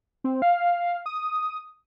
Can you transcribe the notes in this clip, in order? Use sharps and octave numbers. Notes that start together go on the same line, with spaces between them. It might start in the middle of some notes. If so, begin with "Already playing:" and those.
C4
F5
D#6